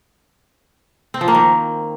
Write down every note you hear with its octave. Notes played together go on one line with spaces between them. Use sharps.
C4
F3
A#3
D#3